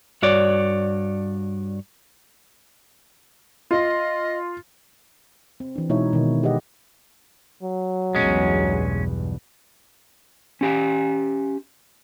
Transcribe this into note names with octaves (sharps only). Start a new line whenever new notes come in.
G2 F#4 C#5 D5
F4 D#5
C4
E3 D4
B2 G#3 D#4 E4 C#5 E5
B2 D#3 B3
G4 G#4 B4 D#5 F#5
F#3
B1 E2 G2 G#3 C#4
C#4 G4 G#5